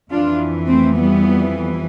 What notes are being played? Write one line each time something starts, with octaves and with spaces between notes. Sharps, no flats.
F2 E3 D4 F4
A3 C4
G3 B3